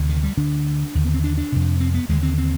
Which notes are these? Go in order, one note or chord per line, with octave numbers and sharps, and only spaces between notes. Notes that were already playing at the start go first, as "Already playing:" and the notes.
Already playing: D2 C3
D#3
G3
D2 D3 D4
D#2 D3
B3
C4
D4
D4
F2 C3
C4
B3
D#2 D3 G#3
C4
C4